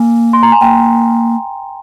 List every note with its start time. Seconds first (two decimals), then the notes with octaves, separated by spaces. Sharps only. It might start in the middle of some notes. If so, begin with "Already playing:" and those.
Already playing: A#3 G#5
0.33 C6
0.43 A#5
0.52 G#5
0.61 A#3 G5